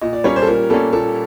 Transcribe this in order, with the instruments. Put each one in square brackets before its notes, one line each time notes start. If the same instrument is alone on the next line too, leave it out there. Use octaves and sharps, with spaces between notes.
[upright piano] A#2 [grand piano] D#5
[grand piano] D5
[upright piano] G3 A#3 C#4 [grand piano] C#5
[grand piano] C5
A4
[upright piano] A#2 [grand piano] A#4
[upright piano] G3 A#3 C#4 [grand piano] A4
[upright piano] A#2 [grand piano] A4